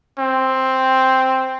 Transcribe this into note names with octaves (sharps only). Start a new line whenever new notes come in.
C4